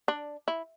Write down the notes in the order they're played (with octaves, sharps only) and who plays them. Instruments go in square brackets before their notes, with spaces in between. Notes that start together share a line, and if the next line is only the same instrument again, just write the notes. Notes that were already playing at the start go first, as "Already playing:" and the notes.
[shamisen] D4
E4